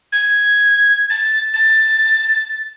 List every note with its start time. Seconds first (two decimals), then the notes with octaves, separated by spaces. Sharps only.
0.12 G#6
1.10 A6
1.54 A6